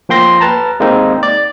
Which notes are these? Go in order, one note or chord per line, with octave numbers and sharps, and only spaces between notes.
F3 A#3 G5 C6 A#6
B4 A5 A#5
G#3 A#3 C4 D#4
D5